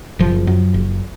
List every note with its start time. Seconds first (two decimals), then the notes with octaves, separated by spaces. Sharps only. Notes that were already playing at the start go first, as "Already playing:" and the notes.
0.19 F#1 F3
0.47 F#2
0.74 F#1